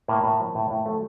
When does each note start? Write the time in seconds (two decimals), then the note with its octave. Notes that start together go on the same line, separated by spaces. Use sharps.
0.08 A2 A#3
0.24 A2
0.39 F3
0.55 A2
0.70 A2
0.86 F3 A3